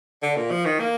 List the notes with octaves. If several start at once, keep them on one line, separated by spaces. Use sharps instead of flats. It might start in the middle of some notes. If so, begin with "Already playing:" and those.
D3
A#2
F3
D#3
A#3